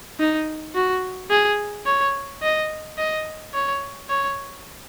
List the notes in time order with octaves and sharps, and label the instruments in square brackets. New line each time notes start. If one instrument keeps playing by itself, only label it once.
[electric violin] D#4
F#4
G#4
C#5
D#5
D#5
C#5
C#5